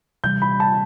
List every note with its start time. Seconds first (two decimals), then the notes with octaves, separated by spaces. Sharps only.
0.24 C3 E3 G3 G6
0.42 B5
0.60 A5